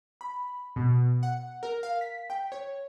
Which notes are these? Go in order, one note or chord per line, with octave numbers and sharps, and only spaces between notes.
B5
B2
F#5
A#4
F5
B6
G5
C#5